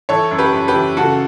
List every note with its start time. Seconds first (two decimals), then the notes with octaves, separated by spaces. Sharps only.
0.09 E3 A4 C#5
0.31 F#2
0.38 G4 B4
0.53 F#2
0.68 G4 B4
0.75 E3
0.97 C#3 F#4 A4